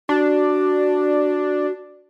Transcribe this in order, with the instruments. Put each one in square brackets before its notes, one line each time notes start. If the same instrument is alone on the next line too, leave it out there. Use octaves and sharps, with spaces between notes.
[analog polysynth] D4 [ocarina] F#4